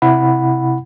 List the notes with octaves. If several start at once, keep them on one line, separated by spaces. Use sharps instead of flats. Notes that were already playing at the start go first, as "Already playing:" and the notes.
C3 E4 F#5 B5